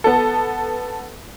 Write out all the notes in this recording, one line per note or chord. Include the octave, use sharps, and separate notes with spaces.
B3 A4